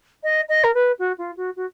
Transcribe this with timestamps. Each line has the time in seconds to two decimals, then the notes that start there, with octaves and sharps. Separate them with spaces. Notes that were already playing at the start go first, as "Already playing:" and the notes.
0.23 D#5
0.49 D#5
0.64 A#4
0.74 B4
0.99 F#4
1.18 F4
1.37 F#4
1.56 F#4